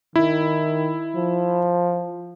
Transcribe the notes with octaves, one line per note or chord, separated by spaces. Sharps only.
D#3 E4
F3